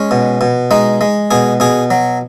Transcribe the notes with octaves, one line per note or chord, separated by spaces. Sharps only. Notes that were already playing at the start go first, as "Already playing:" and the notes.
Already playing: G#3 C#4
B2
B2
G#3 D#4
G#3
B2 G#4
B2 G#4
F#3